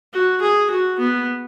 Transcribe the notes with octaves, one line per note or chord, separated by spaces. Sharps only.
F#4
G#4
F#4
B3